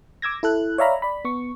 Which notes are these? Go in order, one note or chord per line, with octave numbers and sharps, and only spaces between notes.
D6 E6 G#6 A#6
E4 A4 F#6
C#5 D5 E5 F5 A#5 B5
D5 B5
B3 C#6